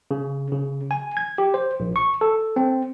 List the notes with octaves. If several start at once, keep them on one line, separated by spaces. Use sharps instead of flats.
C#3
C#3
G#5
G#6
G4
C5
A#1
C#6
A4
C4